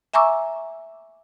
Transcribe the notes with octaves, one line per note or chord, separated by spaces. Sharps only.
E5 G#5 A#5 C#6 D6 E6